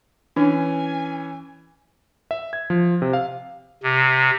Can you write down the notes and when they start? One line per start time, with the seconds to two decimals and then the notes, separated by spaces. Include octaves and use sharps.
0.36 E3 C#4 D4 G#5
2.31 E5
2.53 G#6
2.70 F3
3.02 C3
3.13 F5
3.83 C3